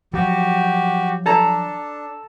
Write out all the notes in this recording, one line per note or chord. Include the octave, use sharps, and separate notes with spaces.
F3 F#3 F#4 G4
D4 A4 A5 A#5